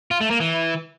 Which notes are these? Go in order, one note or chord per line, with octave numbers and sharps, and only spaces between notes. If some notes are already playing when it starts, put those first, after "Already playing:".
F4
A3
A#3
E3